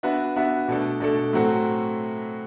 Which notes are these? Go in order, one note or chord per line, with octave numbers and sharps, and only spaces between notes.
B3 D4 F#4 B4 E5
B3 D4 F#4 B4 E5
B2 A3 D4 A4
B2 A3 D4 A4
A2 F#3 C4 F#4 A4